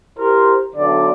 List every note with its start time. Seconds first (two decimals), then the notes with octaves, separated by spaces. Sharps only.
0.19 E4 G4 A#4 C5
0.76 B1 D3 D5